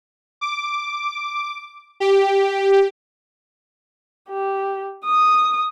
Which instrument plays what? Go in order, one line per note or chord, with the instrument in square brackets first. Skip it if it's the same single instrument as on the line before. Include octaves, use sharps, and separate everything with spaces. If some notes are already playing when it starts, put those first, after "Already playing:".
[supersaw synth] D6
G4
[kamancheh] G4
D#6